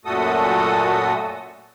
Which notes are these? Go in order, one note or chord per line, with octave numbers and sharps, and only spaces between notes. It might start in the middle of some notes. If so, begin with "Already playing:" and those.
F#2 A#2 A3 F#4 A4 D#6